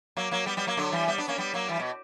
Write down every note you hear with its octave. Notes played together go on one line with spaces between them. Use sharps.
F#3 A#3
F#3 A#3
G3 B3
G3 B3
F#3 A#3
D3 F#3
E3 G3
G3 B3
B3 D4
A#3 C#4
G3 B3
F#3 A#3
E3 G3
B2